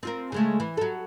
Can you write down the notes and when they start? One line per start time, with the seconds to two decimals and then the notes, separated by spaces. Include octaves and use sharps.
0.03 C4 F4 A#4
0.32 C#3 G#3 A3
0.60 E3
0.77 F#3 A4